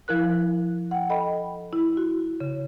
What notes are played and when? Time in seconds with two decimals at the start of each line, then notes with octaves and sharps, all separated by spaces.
0.08 F3 E4 A#4 F#6
0.91 F#5 G5
1.10 A4 D#5 G5 B5
1.73 E4
1.97 F#4
2.40 C#3